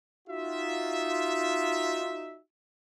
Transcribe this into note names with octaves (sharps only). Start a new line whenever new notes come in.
D#4 F4 F#4 E5